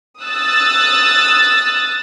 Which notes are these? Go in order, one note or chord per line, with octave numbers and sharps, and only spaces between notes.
D#6 E6 F#6 A6